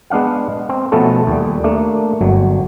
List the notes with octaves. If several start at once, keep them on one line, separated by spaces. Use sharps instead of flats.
G#3 B3 D4 F5 F#5
C4
B2 F3 A3 B3 C#4 A4
D#2 G3
A3 A#3 D4
G1 F#3